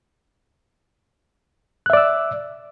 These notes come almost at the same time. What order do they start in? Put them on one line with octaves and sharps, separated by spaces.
F#6 E5 D5 E6